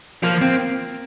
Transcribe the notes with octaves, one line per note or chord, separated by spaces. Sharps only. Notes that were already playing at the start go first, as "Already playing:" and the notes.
F3 A#3
C4